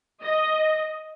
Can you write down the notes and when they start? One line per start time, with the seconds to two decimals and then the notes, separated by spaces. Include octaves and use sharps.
0.21 D#5